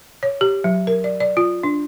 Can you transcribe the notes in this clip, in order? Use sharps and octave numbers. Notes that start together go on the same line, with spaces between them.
C#5
G4
F#3
A#4
D5
D5
F4
D4